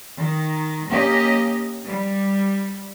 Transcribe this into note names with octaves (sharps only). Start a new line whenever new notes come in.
D#3
A#3 C#4 G4 D#5
G3